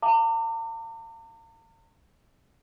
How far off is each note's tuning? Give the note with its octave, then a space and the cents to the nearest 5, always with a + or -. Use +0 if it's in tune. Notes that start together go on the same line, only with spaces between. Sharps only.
F5 +0 A#5 -45 D6 +10